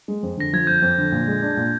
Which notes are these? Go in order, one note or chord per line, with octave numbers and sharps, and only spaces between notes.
G#3
F2
D3 A#6
F3 G#6
F2 G6
F2
D3
A#2
G#3
D4
A#2